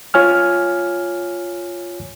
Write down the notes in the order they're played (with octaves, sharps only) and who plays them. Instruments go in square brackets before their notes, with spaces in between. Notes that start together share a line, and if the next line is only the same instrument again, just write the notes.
[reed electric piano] F4 C#5 G#5 F6